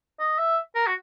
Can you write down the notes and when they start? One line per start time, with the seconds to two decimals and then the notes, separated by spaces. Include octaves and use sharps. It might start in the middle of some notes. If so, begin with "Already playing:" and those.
0.20 D#5
0.38 E5
0.75 A#4
0.87 F#4